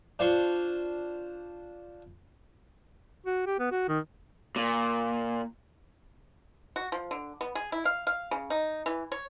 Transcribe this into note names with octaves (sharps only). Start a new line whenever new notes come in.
D4 F4 C5 C6 C#6
F#4
G4
B3
F#4
D#3
A#2
F#4
F3
D3
B3
G#4
E4
F5
F5
C#3
D#4
E3
C#5